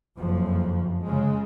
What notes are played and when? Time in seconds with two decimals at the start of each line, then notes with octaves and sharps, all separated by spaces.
0.17 F#1 F2 F3
1.03 C#3 G#3